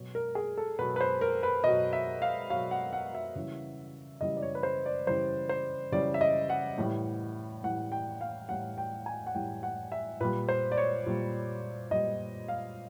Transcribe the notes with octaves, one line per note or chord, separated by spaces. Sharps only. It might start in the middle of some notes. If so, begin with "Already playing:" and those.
Already playing: B2 F#3
A#4
G#4
A4
B2 F#3 B4
B4
C5
A#4
B4
B2 F#3 D#5
E5
F5
B2 F#3 F5
F#5
F#5
E5
C#3 E3 G3
C#3 E3 G3 D#5
D5
C#5
B4
C5
D5
C#3 E3 G3 C5
C5
C#3 E3 G3 D5
E5
D#5
F#5
A2 E3 G3
A2 E3 G3 F#5
G5
F5
A2 E3 G3 F#5
G5
G#5
F#5
A2 E3 G3 G5
F#5
E5
A#2 G3 B4
C5
D5
C#5
A#2 G3
A#2 G3 D#5
F5